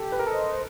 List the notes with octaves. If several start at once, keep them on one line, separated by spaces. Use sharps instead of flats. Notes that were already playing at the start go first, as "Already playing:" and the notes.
Already playing: G4 A4
B4
A#4
A4 C5 D#5